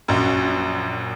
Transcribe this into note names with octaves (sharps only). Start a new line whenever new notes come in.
A#1 F#2